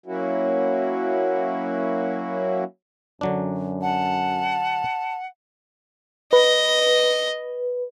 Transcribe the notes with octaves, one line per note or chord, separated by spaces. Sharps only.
F#3 A#3 C#4 E4 F#4
F#2 D3 F#3 D4
F#5 A5
B4 D#5